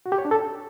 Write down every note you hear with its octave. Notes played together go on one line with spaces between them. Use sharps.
F#4
G4
C#5
D4
A4